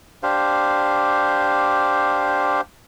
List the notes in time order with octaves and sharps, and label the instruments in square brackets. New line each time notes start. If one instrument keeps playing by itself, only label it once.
[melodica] D4 G4 C5 F5